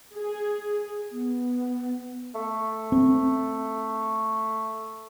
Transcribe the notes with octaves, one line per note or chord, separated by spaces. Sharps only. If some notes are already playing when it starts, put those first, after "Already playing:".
G#4
B3
A3
C4